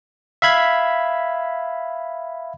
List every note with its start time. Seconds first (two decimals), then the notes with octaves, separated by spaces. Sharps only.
0.42 E5 F5 B5 G#6